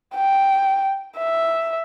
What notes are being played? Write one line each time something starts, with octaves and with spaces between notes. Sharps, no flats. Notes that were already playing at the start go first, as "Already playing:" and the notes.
G5
E5